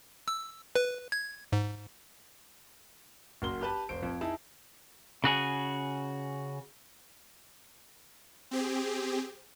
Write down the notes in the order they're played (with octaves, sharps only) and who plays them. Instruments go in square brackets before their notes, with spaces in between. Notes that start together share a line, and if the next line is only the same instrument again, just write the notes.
[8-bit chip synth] E6
B4
G#6
G#2
[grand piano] F#1 F#4 A#4 C6 G7
G4 B4 A5
F1 C5 D7
F2
D#4 E4 G#4 A5
[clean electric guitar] C#3 F#4 G#4
[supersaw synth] C4 G4 G#4